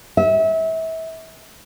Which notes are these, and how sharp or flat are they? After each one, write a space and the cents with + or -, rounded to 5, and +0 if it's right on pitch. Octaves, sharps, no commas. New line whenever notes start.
E5 -30